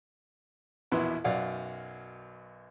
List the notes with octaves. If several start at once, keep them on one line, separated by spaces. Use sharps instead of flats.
A#1 E2 B2 B3 E4 C6
B1 F#2 D5 F5 F#5